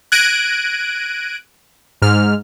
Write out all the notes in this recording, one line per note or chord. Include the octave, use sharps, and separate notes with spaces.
F#6 G#6 A#6 D7 D#7
G#2 F6